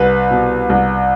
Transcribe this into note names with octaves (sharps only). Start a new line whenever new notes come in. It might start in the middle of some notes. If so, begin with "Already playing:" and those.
Already playing: C2 B4
B2
C2